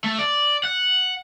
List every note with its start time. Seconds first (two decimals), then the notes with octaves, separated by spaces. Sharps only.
0.04 A3
0.19 D5
0.64 F#5